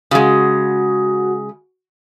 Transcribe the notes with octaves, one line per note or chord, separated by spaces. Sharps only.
C#3 G#3 F#4